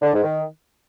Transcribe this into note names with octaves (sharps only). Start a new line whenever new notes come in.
D3
G#2
D#3